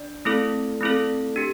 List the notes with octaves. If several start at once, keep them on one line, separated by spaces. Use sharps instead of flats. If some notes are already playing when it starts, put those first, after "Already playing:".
Already playing: D4 D5
A3 C4 E4 A4
A3 C4 E4 A4
D4 G4